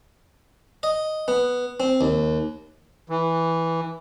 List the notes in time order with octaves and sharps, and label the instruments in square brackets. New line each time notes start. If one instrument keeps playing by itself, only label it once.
[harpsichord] D#5
B3
C4
D#2
[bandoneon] E3